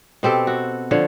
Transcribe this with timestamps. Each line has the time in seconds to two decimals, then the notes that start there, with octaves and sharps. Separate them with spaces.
0.23 B2 C4 G4 A4
0.47 F#4
0.91 D3 F3 F4 C#5